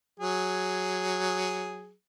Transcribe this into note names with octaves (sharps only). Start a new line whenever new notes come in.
F#3 G#4